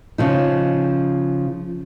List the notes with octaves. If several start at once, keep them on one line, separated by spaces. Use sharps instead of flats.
C#3 F3 D#4